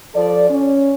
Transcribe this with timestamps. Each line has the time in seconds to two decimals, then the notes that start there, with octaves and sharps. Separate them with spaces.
0.14 F3 A4 D5
0.50 C#4